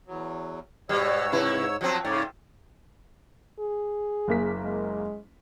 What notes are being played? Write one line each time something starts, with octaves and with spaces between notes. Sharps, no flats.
E2 F#3
G#2 B2 G3 C#5 E6
C3 E4 B4
F3 F#3 C4
G#2 C#3 C#5 D5
G#4
F#1 A#3 B6
G#3